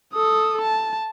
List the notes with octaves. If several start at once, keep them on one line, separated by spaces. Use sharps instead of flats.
A4 D#6
A5